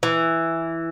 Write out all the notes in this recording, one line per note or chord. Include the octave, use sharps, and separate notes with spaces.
E3